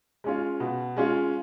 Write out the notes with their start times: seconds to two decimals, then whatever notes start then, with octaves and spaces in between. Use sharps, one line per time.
0.24 G#3 C#4 F4
0.60 B2
0.97 G#3 C#4 F4